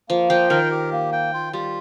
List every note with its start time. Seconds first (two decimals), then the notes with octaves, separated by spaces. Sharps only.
0.09 F3 A#3
0.30 F3 G5
0.50 D#3 A#4
0.71 G4
0.92 A#3
1.12 G5
1.34 F4
1.53 G3 F4